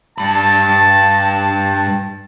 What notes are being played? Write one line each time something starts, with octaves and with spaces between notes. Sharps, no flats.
G2 A5 B5